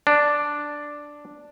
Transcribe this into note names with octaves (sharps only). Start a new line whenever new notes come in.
D4